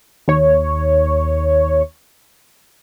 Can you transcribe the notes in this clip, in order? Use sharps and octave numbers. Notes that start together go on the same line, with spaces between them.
D#2 C#5